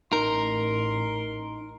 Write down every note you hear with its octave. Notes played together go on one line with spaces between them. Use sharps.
A1 D#4 A#4 C6